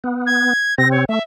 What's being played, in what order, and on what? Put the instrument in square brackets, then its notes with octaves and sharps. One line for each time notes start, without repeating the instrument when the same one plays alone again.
[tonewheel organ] B3
[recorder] G#6
[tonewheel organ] C3 C4 [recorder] A#6
[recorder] C#5
[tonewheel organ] A3 [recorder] E5